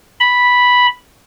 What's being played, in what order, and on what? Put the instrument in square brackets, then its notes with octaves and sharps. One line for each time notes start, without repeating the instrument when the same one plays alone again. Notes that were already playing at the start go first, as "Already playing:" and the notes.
[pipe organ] B5